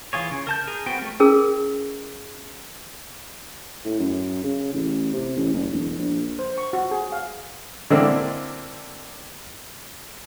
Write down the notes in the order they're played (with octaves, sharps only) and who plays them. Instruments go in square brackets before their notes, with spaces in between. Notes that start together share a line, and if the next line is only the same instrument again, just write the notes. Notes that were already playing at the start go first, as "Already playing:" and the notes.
[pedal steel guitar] E3 F4 G#4 C#5
C#3
A#4 A5 G6
G#4 A#4
B3 C4 F#4 G5
A3 D#4 F#4 A#4
[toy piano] C#4 E4 G#4 A#4 E6
[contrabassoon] A2
F#2
C#3
A1
C3
A1
F#1
E1
A#1
[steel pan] C5
C#6
F#4
G#4
F5
[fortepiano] D3 G#3 A#3 C4 D4 E4